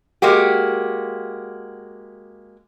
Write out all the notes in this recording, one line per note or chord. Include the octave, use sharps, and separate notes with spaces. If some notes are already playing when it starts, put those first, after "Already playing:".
G#3 A#3 F#4 G4